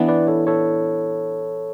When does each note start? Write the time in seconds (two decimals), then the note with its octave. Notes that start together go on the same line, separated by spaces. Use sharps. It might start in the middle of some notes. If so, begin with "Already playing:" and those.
Already playing: E3 B3 D4
0.08 B4 D5
0.27 A4 C#5
0.47 A4 C#5